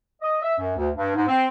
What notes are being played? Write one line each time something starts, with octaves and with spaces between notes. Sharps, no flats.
D#5
E5
F#2
D2
G2
G#2
C4